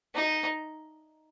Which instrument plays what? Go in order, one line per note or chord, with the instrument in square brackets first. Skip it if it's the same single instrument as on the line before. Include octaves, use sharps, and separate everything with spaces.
[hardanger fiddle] D#4